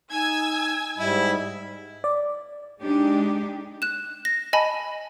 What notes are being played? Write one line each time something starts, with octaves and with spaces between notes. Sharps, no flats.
D#4 G#5 E6 G#6
G#2 G3 E4 D#5
D5
G#3 D4 D#4 G4
F#6 E7
A#6
D#5 G#5 A5 B5